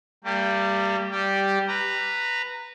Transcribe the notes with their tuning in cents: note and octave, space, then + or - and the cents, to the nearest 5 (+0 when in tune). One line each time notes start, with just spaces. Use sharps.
G3 +0 A#3 -40 G4 +0
G3 -5 G4 +0
B4 +0 A#5 -15